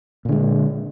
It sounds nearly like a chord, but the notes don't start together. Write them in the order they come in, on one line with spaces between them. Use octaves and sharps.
A#2 D3 G#3